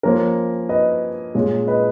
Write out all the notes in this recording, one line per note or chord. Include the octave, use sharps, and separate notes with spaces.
F3 A#3 C#4 A#4
B4 D#5
A#2 G#3 C#4
B4 D#5